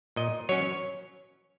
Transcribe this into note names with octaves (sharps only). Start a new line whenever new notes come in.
A#2 D#5
F#3 C#4 C#5